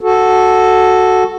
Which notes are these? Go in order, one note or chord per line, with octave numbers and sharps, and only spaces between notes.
F#4 A4